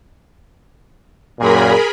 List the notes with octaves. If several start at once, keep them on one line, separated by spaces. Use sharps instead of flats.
F#2 A#2 G#4 A#4 B5